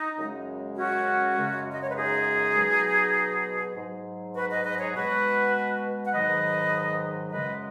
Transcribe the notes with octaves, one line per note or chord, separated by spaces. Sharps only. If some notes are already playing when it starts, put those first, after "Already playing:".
Already playing: D#4
F#2 C#3 G#3
C#4 F#4
F#2 C#3 G#3
D#5
C#5
B4
D#4 G#4
B2 F#3
G#2 F#3
F#4 B4
B4 D#5
B4 D#5
G#4 C#5
B2 G#3 F#4 B4
F#5
G#2 D#3 F#3 B4 D#5
F#2 C#3 G#3 B4 D#5